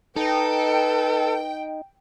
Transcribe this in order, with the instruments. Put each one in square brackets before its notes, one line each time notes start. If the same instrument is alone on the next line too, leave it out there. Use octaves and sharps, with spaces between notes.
[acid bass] D#4 [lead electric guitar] A4 [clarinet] B4 [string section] G5